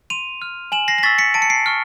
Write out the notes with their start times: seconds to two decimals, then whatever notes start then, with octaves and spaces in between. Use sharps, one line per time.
0.10 C6 D#7 F7
0.42 F6
0.72 G#5 E7 F#7
0.88 A#6 C7
0.98 A#6
1.03 C#6 E6 A6 B6
1.18 B6 C#7
1.34 A5 D7
1.42 C#7
1.50 C7 D7
1.66 C#6 F6